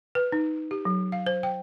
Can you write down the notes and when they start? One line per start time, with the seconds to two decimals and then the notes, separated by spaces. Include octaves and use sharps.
0.15 B4
0.32 D#4
0.71 G4
0.85 F#3
1.12 F5
1.27 C5
1.43 G5